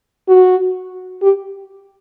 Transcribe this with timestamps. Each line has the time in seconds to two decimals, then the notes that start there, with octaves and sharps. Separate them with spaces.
0.28 F#4
1.22 G4